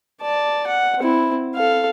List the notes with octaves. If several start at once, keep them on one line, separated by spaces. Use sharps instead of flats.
D5 A5
F#5
C4 E4
A4 F5